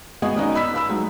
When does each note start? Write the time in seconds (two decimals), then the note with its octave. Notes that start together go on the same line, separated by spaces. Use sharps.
0.22 G#3 B3 F#4 G#4 D#5 G#5
0.36 B3 C#4 D#4 F#4 D5 D#5
0.55 B5 E6 B6
0.73 B4 F5 B5 E6
0.89 F#3 G#3 D#4